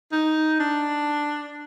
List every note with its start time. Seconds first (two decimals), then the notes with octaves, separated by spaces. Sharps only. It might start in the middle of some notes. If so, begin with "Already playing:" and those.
0.12 D#4
0.59 D4